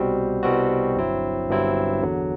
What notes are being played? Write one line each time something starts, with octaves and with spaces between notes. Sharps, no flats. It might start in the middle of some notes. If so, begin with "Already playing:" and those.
Already playing: C2 B2 G3 C4 F#4
C2 B2 G3 C4 F#4
G1 G2 F#3 C4 E4
G1 G2 F#3 C4 E4
E2 D3 F#3